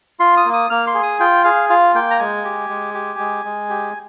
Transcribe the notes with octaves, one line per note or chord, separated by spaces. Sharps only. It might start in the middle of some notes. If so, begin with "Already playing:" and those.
F4 C6
D#6
A#3
D#6
A#3 F6
C6
G#4
D#6
F4 G5
G#4 F5
F4 F5
A#3 G5
A#5
G#3 G#5
G4
G#3
G4
G#3
G#3
G4